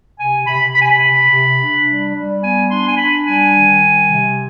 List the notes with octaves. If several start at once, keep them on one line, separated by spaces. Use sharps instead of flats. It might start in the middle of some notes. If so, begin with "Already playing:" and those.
C3 G#5
C3 B5
C3 B5
G#5
B5
C3
C3
D4
G3
G3
B3 G#5
D4 C6
G#5
D4 B5
G3 G#5
D#3
G3
C3